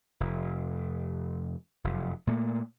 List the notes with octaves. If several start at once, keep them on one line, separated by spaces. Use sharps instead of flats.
F1
F1 F#2
A#2 A3 A#3